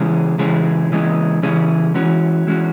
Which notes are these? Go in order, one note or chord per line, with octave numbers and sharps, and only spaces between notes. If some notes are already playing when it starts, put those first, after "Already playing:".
Already playing: C#3 E3 G#3 C#4 G#4
C#3 E3 G#3 C#4 G#4
C#3 E3 G#3 C#4 G#4
C#3 E3 G#3 C#4 G#4
E3 G#3 C#4 F#4
E3 G#3 C#4 F#4